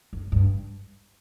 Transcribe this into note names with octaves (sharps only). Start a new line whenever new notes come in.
F#2
G2